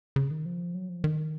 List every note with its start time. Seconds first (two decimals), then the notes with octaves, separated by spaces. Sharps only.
0.16 C#3
0.31 D#3
0.45 F3
0.75 F#3
0.89 F3
1.04 D#3